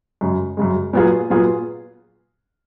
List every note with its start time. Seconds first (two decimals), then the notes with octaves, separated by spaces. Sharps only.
0.21 F#2 C#3 G#3
0.57 F#2 C#3 G#3
0.93 A#2 F#3 B3 F4 G#4
1.30 A#2 F#3 B3 F4 G#4